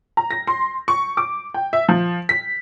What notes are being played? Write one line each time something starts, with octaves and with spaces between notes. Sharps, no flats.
A#5
A#6
C6
C#6
D6
G5
E5
F3
B6